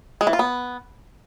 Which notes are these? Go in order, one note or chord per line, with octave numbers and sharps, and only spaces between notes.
G#3
E3
F4
B3